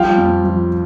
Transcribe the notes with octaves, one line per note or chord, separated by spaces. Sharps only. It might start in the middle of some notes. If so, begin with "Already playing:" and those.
Already playing: F3 G3 F5 G5
F2
F3